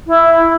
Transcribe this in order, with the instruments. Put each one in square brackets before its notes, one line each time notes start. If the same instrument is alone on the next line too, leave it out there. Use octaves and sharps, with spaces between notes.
[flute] E4